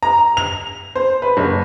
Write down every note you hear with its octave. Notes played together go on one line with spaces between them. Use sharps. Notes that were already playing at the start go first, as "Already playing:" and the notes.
A#5
F7
C5
B4
F#1